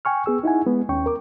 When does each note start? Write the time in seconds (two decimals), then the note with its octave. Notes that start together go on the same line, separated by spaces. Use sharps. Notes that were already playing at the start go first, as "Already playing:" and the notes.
0.05 G5 G#5 C#6 F6
0.26 B3 G#4 E6
0.43 D#4 E4 F#5 G#5
0.67 G#3 B3
0.89 D#2 C#4 G5 C#6
1.06 A#4 D6